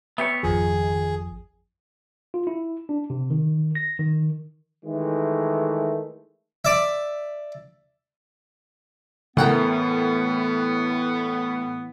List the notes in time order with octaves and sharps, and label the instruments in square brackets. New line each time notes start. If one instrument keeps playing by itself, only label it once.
[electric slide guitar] B3 G4 C#5 [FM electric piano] E5
[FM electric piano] G#1 F2 F3 [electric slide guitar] D#3 [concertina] G#4
[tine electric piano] F4
E4
D4
C3
D#3
A#6
D#3
[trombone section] D#3 E3 G#3 A3
[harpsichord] D5 E5
[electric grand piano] A2 [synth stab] C#3 F#5 G5 [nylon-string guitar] E3 A3 A#4 [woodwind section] B3